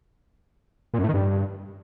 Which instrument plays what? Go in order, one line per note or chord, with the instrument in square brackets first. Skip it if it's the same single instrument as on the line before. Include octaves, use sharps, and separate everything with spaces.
[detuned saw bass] A#2
F#2
A2
D#3
G2